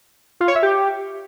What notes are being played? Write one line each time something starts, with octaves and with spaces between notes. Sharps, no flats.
F4
C#5
E5
G4